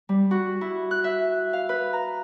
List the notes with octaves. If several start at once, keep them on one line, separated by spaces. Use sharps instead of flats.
G3
F#4
E4
F#6
E5
F5
B4
A#5